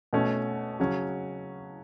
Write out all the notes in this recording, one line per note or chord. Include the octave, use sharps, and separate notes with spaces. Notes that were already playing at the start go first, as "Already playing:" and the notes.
B2 A3 C#4
C#3 F#3 C#4